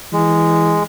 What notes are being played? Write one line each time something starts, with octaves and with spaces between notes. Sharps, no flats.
E3 G#3